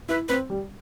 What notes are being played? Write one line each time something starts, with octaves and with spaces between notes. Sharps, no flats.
E4 B4
C4 B4
G3